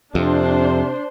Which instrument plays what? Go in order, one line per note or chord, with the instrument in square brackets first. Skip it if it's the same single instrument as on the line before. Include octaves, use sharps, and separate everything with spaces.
[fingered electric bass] F2 [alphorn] C3 [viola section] D4 C5